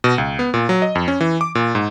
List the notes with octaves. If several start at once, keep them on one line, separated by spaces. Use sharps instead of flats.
B2
C#2
B3
A#2
F#3
D#5
F2
C#4
E3
D6
A#2
G#2